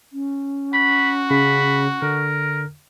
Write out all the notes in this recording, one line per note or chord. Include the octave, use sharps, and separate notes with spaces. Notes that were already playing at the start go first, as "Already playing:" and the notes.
C#4
F#4 B5
C#3 B5
D3 A#4